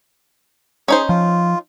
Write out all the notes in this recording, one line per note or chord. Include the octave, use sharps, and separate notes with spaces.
C#4 D#4 G#4 C5
F3 F4